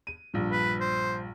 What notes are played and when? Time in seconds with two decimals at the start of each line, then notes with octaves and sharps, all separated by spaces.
0.07 D#7
0.34 A#1 G2
0.52 B4
0.81 C5